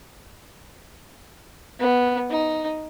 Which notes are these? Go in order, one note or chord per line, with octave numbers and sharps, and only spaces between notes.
B3
D#4